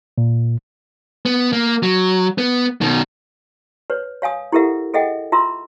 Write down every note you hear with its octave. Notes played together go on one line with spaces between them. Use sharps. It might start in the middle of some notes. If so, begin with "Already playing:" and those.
A#2
B3
A#3
F#3
B3
B2 D#3
B4 C#5
C#5 F5 G#5 D#6
E4 G4 A4 A#4 E5 F#5
G#4 A4 D#5 E5 F#5 G5
F4 E5 A#5 C6 E6